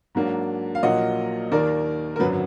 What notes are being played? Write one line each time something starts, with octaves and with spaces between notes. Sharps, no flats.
G#2 F#3 A#3 D4
F5
A#1 A#2 F#3 A#3 F4 D#5 F#5
D#2 D#3 A#3 A#4 D5
A#4
G#1 F#2 D3 F#3 B4